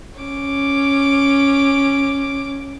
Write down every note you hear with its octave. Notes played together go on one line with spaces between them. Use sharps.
C#4 D6